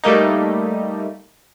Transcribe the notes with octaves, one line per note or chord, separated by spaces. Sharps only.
G3 A3 A#3 D#4